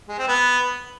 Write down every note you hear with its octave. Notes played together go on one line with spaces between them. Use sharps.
G#3
C4
B3